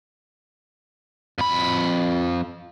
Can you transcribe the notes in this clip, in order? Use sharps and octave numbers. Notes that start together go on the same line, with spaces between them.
F2 B5